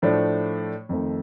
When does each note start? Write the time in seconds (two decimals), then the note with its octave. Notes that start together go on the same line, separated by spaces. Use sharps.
0.02 A2 F3 A3 D4
0.89 F2 D#3 A3